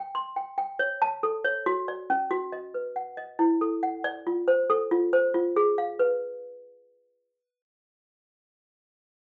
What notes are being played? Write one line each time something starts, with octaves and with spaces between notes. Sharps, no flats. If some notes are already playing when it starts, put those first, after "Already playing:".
Already playing: G5
C6
G5
G5
C#5
A5
A4
C#5
F#4
D5
C#4
F#4
D#5
B4
F#5
D#5
E4
A4
F#5
D5
F4
C5
A4
F4
C5
F4
G#4
F5
B4